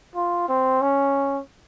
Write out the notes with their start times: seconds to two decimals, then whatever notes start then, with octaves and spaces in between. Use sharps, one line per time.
0.15 F4
0.49 C4
0.81 C#4